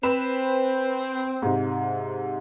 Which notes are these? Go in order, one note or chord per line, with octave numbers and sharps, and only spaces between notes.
C4 B4 E7
G#2 C3